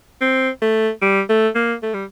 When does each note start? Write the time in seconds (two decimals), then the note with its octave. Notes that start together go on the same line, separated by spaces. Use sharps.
0.21 C4
0.62 A3
1.02 G3
1.30 A3
1.55 A#3
1.83 A3
1.94 G3